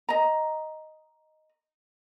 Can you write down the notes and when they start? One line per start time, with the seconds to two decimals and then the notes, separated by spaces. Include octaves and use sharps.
0.09 D#5 A#5